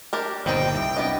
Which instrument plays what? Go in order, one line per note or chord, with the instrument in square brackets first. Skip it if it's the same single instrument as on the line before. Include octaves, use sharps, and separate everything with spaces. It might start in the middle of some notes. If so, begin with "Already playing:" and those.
[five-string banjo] D4 G4 A#4
[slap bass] G1 A#2 D#3 [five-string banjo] G3 C4 D#4 [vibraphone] C5 [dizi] G5
[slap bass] C2 [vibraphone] E5
[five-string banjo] G3 B3 D#5 [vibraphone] D4 B5